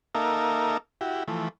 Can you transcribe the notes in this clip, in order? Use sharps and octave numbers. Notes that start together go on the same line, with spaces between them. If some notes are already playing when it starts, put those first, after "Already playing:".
A#3 D#4 A4 A#4 E5 F5
E4 F#4 G4
E3 F3 A3